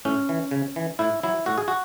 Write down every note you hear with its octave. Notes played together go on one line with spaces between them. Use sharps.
A2 C#4
E3
C#3
E3
A2 E4
F#3 E4
A2 F#4
G#4
F#4